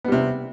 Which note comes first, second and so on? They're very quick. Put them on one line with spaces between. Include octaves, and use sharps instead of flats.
B3 G3 C3